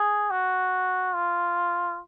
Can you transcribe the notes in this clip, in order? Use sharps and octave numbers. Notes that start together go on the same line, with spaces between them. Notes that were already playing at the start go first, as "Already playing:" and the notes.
Already playing: G#4
F#4
F4